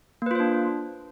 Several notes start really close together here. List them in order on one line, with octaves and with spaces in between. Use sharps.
A#3 B4 F4 C5 D4